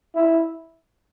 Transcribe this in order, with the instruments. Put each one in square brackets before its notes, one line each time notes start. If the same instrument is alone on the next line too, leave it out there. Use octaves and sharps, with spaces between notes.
[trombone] E4